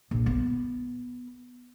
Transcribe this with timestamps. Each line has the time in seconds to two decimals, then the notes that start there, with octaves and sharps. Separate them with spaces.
0.11 A#1
0.26 B3